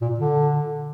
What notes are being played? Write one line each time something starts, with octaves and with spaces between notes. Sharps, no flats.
A#2
D3